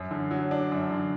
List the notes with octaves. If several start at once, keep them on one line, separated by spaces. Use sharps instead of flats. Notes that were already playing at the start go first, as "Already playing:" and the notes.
Already playing: F#2
D3
F#3
D4
F#2
D3